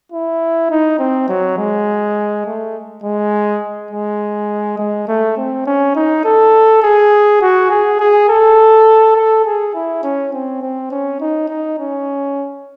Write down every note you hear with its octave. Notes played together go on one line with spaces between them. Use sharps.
E4
D#4
C4
F#3
G#3
A3
G#3
G#3
G#3
A3
C4
C#4
D#4
A4
G#4
F#4
G#4
G#4
A4
A4
G#4
E4
C#4
C4
C4
C#4
D#4
D#4
C#4